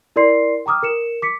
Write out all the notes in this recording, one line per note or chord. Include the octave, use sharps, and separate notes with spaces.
E4 A#4 D5 C6 C7
G5 A#5 D6 D#6 F6
A#4 C#7 E7
D6 B6 C#7